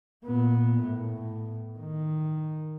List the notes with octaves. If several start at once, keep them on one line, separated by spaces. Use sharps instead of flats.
A#2 B3
A2
D#3